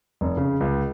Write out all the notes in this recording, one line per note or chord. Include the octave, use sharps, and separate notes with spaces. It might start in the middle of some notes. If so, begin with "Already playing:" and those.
F1
C#3
C#2